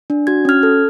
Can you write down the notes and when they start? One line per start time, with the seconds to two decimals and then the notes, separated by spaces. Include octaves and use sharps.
0.10 D4
0.27 F#4 G#6
0.45 C#4 F6 G#6
0.63 A4